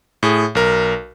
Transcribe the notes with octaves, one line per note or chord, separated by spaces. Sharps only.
A2 G#4
B1 A#4